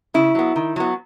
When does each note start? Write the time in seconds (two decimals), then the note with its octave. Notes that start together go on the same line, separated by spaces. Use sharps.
0.14 C#3 E4
0.35 F#3 B3
0.56 D#3
0.76 F#3 B3